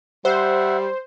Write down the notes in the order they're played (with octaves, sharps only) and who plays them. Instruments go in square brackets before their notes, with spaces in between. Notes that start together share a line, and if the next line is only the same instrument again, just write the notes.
[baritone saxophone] G3 [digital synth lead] C5 [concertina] E5 F#5